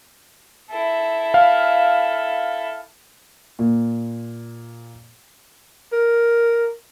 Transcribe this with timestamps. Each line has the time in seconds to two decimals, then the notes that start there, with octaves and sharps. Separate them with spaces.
0.71 E4 A4
1.34 F5
3.59 A#2
5.93 A#4